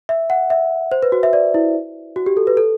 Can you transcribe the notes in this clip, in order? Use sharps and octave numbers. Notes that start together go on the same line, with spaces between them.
E5
F#5
E5
C5
B4
F#4
E5
D5
E4
F#4
G4
A4
B4
A4